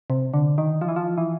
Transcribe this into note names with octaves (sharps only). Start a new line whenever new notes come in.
C3
D3
D#3
F3
E3
F3
E3